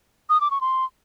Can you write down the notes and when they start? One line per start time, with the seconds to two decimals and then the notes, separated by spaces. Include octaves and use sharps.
0.29 D#6
0.41 D6
0.51 C#6
0.61 C6